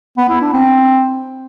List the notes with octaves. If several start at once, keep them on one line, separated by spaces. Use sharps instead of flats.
B3
E4
D4
C4